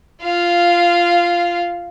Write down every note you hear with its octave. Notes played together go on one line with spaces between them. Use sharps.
F4 F5